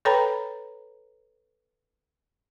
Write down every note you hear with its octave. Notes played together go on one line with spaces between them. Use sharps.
A4 B4 C#5 G5 A#5 B5